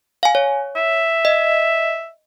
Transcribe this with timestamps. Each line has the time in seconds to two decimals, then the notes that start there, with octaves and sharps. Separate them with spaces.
0.23 F5 G#5
0.35 C#5
0.76 E5
1.25 D#5